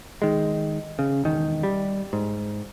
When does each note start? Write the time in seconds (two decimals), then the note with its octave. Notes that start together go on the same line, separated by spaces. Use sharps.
0.22 D#3 G#3
0.99 C#3
1.24 E1 D#3
1.63 G3
2.13 G#2